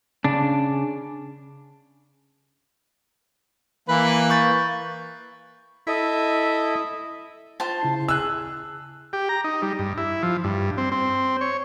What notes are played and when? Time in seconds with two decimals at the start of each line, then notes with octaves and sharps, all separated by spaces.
0.24 C#3 D4
3.89 E3 A#3 B4
4.30 C#6 G6 A6
5.87 E4 A4 D#5
7.60 F4 C5 A5
7.81 C#3 E4 C7
8.09 G#4 E6 F#6
9.13 G4
9.29 A#5
9.44 D#4
9.62 G3
9.79 G2
9.98 E4
10.23 F3
10.44 G2
10.77 C4
10.92 C4
11.41 C#5